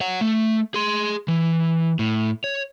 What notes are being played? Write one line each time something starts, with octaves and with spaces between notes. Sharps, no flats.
C#5 F#5
A3
G#4 C6
E3
A2
C#5